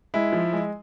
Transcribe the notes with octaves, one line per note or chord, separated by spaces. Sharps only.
G#3 E4
F3
G#3